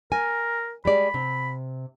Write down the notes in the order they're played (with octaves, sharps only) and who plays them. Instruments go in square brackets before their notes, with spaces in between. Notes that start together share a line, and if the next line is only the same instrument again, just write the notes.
[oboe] A#4 [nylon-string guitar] G#5
[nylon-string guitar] G3 G#3 D5 [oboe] B5
[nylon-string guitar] C3